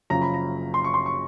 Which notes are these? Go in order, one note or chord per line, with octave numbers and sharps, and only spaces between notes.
F#1 F#2 C#3 F3 A#5
B5
A#5
C6
C#6
C6
C#6